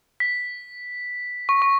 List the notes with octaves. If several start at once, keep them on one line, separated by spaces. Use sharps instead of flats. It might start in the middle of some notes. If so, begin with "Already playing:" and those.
B6
C#6
C#6